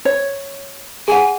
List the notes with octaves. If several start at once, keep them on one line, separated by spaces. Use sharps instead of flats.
C#5
G#4 F#5 G#5